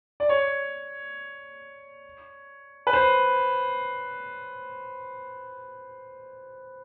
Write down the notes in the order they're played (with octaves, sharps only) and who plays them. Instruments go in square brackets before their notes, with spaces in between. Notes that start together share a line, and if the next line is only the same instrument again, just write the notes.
[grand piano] D5
C#5
B4
C5